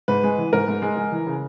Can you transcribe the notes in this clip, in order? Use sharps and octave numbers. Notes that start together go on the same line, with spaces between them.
G#2 B4
G#3
E3
G#2 A#4
G#2
G#3
G#3
E3
C#3